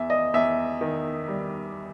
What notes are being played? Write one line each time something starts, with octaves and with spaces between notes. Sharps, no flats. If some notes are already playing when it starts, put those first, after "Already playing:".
Already playing: E2 E5
D#5
E2 E5
D#3
G3